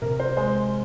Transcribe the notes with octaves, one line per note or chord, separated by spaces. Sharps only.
C3 A#4
C5
G#3 C5